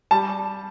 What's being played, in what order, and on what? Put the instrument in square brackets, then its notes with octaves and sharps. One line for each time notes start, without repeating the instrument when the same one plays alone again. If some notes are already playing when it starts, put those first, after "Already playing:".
[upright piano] G3 A5